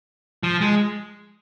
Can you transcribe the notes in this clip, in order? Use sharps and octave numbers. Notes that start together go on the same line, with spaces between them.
F3
G#3